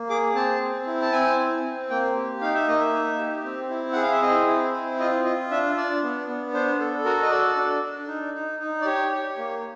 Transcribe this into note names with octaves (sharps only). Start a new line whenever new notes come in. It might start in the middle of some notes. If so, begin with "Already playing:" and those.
Already playing: A#3
G#4 D6
C4 A5
C4
E4
A5
C4 G#5
C4
C4
A#3 G5
G4
D#4 F5
E5
A#3 D#5
E5
D#4
G4
C4
E4
G#4 F#5
F5
E5
C4 D#5
E4
C4
F4 D#5
F4 D#5
D4 E5
D4 D5
B3
B3
D4 C5
A4
F#4 A#4
D#5
A4 D5
D4
D4
D#4
D#4
D#4
D5
G4 C#5
G4
A#3